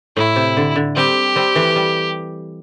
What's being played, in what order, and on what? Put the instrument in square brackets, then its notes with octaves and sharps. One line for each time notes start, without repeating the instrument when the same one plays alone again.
[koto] A2 [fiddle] E4
[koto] C3
D3
D3
[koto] G3 C4 [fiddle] G4
[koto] G3 C4
E3 A3
G3